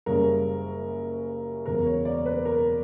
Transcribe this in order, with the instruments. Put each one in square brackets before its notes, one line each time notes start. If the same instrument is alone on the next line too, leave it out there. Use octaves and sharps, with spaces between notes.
[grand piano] F#1 F#2 C#3 G3 C#4 A#4
E1 E2 C#3 F#3 A#4
C#5
D5
B4
A#4